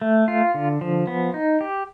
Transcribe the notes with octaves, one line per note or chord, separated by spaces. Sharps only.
A3
F4
D3
F3
B3
D#4
G4